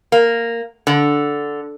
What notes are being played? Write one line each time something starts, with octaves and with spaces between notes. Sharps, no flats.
A#3
D3